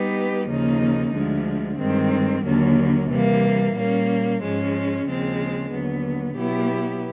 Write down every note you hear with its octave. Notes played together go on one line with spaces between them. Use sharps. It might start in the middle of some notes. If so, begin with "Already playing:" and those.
Already playing: G3 B3 D#4 G4 B4
D#2 C#3 F3 A#3 D#4
D2 D3 F3 G#3
G2 D#3 G#3 C4
D#2 D3 F#3 A#3
C3 E3 G3 A#3
A#2 G3 A#3 C#4
G#2 F3 G#3 C#4
D#2 C#3 F3 G#3 C4
D#2 D3 F#3 B3
B2 F#3 B3 E4 G4